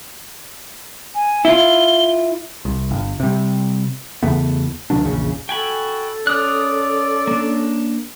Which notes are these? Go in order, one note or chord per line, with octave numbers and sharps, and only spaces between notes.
G#5
E4 F4 G7
C2
G1
C3 G3
E2 C#3 A3 B3
D2 D#3 F#3 D4
A#1 E2 C#3
F#4 A4 G5 G#5 B5
C#4 A#4 D5 D#6 F#6
A#3 D4